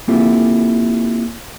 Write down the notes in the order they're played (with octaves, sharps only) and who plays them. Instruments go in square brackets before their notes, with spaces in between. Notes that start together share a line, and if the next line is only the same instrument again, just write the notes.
[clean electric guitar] A#3 C4 E4 F4 G4 A4